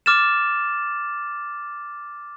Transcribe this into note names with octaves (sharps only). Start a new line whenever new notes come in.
D6 F6 A6 E7